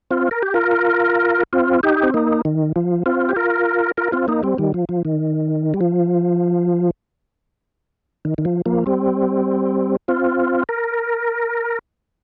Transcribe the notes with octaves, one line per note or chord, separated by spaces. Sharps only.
C4 F4
A#4
G4
F4 A#4
C4 F4
D#4 G4
C4
A#3 D#4
D#3
F3
C4 F4
G4
F4 A#4
F4 A#4
C4 F4
A#3 D#4
G3 C4
D#3 G3
F3
F3
D#3
G3
F3
D#3
D#3
F3
F3 A#3
G3 C4
C4 F4
A#4